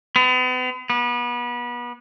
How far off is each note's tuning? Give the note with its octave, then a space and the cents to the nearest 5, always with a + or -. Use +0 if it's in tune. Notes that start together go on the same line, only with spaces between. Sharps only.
B3 +40
B3 -30